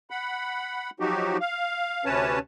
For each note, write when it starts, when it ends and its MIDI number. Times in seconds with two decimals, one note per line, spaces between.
0.10 0.90 78
0.10 0.90 83
1.00 1.37 53
1.00 1.37 54
1.00 1.37 63
1.00 1.37 66
1.00 1.37 67
1.41 2.05 77
2.05 2.39 38
2.05 2.39 48
2.05 2.39 61
2.05 2.39 71
2.05 2.39 73
2.05 2.39 81